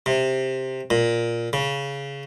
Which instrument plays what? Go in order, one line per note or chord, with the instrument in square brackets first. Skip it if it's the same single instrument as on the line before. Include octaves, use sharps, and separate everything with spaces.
[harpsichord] C3
A#2
C#3